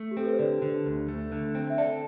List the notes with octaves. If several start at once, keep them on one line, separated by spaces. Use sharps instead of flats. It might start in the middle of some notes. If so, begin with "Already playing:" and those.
Already playing: A3
G4
C4 A4
B4
C5
D3 D5
D3
D2
A3
D3
C4
E5
A4 D5